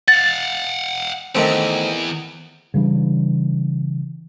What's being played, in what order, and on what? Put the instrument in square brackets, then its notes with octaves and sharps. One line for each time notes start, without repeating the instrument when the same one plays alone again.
[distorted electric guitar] F5 F#5 [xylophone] A6
[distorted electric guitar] E2 [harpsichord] D#3 A3 C4
[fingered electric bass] C#3 E3 G3 D4